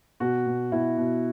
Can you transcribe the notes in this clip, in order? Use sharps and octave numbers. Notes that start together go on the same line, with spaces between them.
B2 F#4
B2
B2 E4
B2